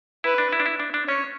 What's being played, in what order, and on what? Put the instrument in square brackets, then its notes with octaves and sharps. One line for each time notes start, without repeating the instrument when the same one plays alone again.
[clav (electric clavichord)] E4 [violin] B4
[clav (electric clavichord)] D4
E4
D4
E4
D4
D4
[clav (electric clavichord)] C#4 [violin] C#5